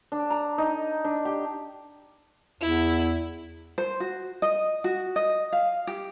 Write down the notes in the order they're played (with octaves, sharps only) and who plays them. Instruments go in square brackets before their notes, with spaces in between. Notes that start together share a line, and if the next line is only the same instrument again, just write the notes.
[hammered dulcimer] D4
A#5
D#4
D4
G4
[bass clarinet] E2 [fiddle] E4
[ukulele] C5
F#4
D#5
F#4
D#5
F5
G4